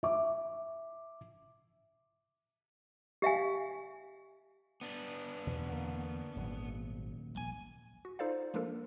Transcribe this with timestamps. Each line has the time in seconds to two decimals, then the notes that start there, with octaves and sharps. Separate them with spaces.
0.03 E5 D6
3.22 G4 E5 F5 G#5
4.81 B3 D4
5.47 E2 B2
5.69 D3 A#3
6.37 D#1 G#1 F#3
7.37 A#1 G#5
8.05 F#4
8.19 D#4 F4 A4 C5 D5 F5
8.54 F3 G#3 A#3 D4 A4 A#4